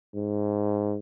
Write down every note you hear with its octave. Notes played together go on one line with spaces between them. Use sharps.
G#2